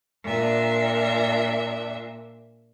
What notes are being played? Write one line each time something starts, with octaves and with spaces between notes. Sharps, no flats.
A#2 D4 E5